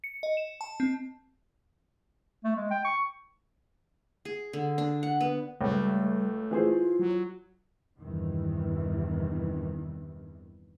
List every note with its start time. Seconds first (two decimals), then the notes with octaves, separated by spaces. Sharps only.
0.04 C#7
0.23 D#5
0.37 E7
0.61 A5
0.80 C4
2.44 A3
2.56 G#3
2.71 G5
2.85 C#6
4.25 G#4
4.53 D3
4.78 D4
5.03 F#5
5.21 B3
5.61 C#2 G3 A3
6.51 E3 F4 G#4 C5
6.99 F#3
7.99 E2 G2 C3 D#3 E3